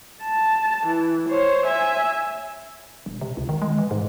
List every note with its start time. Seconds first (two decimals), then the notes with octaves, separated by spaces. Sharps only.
0.23 A5
0.87 E3
1.29 C5 C#5
1.67 E5 G#5
3.06 E1
3.21 C3
3.37 C#2
3.49 D#3
3.62 G#3
3.78 E3
3.91 G#2